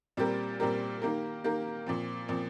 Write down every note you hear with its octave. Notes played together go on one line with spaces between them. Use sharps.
A#2 G3 C4 G4 A#4
A#2 G3 C4 G4 A#4
D#3 A#3 G4 A#4
D#3 A#3 G4 A#4
A#2 F3 C4
A#2 F3 C4